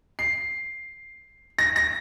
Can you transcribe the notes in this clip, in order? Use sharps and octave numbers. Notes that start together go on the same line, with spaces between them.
C7
A#6
A#6